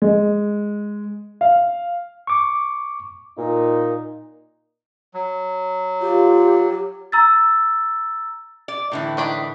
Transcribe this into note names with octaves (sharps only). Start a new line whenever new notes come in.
G#3
F5
C#6 D6
A#2 D#4
F#3
F4 G4
A#5 E6 A6
D5
A2 D3 E3
D#3 D4 B5